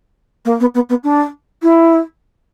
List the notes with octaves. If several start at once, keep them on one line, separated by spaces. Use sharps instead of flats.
A#3
B3
B3
B3
D4
E4